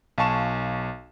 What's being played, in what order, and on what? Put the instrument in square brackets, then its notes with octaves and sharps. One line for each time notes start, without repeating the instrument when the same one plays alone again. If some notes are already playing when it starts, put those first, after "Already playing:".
[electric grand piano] B1 F5 G#5 A5 C#6 E7